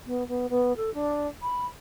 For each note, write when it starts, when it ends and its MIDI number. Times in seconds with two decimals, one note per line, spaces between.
0.06 0.27 59
0.28 0.47 59
0.49 0.75 59
0.76 0.93 69
0.94 1.27 62
1.42 1.67 83